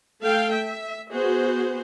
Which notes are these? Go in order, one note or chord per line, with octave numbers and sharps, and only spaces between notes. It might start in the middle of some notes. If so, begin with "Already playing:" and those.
A3 A4 F5 G5
E5
B3 F#4 G#4 C5